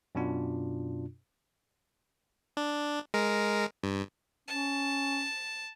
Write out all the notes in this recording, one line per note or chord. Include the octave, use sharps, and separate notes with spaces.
F#2 B2 D4 F4
D4
G#3 A#4
G2
C#4 A5